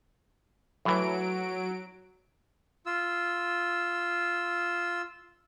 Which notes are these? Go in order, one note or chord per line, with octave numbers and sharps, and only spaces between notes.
A2 E3 F#3 D7
F4 E6